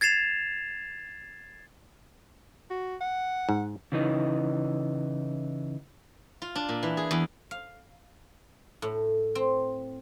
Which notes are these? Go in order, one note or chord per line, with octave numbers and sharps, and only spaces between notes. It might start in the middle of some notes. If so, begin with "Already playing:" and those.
G#6 A6 C7 E7 F7
F#4
F#5
G#2
C#3 E3 D#4
F4
D4
A#2
E3
G#4
E2
F5
A2
C4